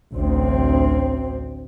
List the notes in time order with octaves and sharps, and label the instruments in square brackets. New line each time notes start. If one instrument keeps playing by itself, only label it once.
[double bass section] A1 D2 C4